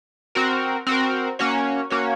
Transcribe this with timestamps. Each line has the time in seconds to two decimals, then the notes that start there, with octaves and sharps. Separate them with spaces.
0.35 C4 F#4 A#4
0.87 C4 F#4 A#4
1.39 A#3 C#4 F#4 C#5
1.90 A#3 C#4 F#4 C#5